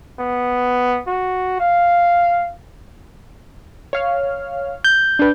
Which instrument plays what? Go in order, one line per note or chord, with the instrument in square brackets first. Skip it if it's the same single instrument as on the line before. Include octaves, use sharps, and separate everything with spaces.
[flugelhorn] B3
F#4
F5
[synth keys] C#5 F5 F6
[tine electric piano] G6
[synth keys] D4 B4